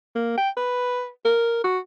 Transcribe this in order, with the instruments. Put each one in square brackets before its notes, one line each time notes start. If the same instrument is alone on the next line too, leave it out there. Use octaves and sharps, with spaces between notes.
[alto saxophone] A#3
G5
B4
A#4
F#4